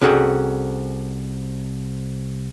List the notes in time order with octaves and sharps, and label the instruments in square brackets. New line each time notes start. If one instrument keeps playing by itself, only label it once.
[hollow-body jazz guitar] C2 C#4 F#4 G#4 A4 G5